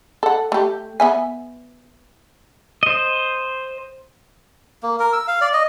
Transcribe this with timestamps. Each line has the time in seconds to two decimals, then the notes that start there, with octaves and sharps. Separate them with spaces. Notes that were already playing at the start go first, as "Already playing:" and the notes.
0.23 A4 F#5
0.52 A3 G4
1.00 B3 E5 G#5
2.83 C5 D#5
4.83 A#3
5.00 A#4
5.13 E6
5.28 F5
5.41 D5
5.54 D#5